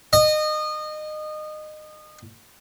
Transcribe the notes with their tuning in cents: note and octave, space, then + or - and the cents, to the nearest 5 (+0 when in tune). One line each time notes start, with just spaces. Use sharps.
D#5 -25